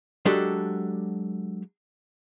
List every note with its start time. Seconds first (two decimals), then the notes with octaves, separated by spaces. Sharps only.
0.25 F#3 G#3 D4 F#4 G4 A4